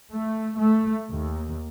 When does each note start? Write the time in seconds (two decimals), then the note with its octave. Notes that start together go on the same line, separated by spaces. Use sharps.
0.12 A3
0.57 A3
1.10 D#2